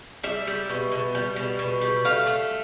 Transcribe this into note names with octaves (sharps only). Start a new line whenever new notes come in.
G3 E5
G3
B2
B2
G3
B2
B2
G3
A3 F5
A3